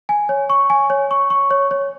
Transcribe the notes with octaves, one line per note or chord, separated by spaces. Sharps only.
G#5
C#5
C#6
G#5
C#5
C#6
C#6
C#5
C#5